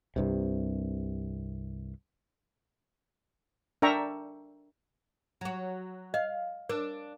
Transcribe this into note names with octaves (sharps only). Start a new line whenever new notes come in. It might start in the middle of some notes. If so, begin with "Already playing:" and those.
C2 G2 C3
D4 A#4 E5 G5 A#5 C#6
F#3 F#4
D#5 F5
D4 A#4